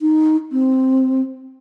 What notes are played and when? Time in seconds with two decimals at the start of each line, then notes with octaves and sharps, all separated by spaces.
0.02 D#4
0.52 C4